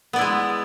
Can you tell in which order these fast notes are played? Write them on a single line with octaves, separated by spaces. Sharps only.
B3 D5 E4 G#3